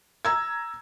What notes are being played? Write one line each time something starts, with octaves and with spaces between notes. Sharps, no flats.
A#5 E6 G#6